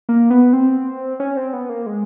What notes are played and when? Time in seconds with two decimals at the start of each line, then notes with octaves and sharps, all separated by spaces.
0.09 A#3
0.30 B3
0.53 C4
1.20 C#4
1.37 C4
1.53 B3
1.70 A#3
1.86 G#3